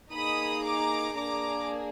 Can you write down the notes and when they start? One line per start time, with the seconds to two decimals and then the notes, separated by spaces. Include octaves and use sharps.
0.12 A#3 D#4 G#4 B5 D#6
0.63 A#5 D6
1.15 A#3 D4 G#4 A#5 D6